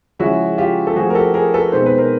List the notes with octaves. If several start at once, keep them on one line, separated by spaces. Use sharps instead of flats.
C#3 F3 G#3 C#4 E4 F#4
F4 G4
A4
F3 A3 C4 E4 F#4 G#4
A#4
G4 A4
G#4 A#4
A4 B4
B2 G#3 C4 D#4 C5
B4
A#4 C5